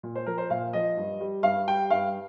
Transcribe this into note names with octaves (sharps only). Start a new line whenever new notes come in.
A#2
C5
F3 A#4
C5
A#2 F5
F3 D#5
G2
G3
G2 F5
G3 G5
G2 F5